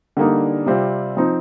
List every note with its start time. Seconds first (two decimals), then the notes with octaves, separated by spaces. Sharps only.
0.17 D3 G3 A#3 D#4
0.66 C3 G3 C4 F4
1.17 F3 C4 D#4